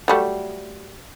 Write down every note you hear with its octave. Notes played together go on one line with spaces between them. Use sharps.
F#3 G3 A3